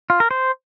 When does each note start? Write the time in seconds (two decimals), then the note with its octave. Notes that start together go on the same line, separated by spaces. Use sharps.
0.10 F4
0.20 A#4
0.31 C5